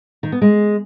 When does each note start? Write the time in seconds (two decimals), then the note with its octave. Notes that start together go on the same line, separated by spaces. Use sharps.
0.23 D#3
0.32 B3
0.41 G#3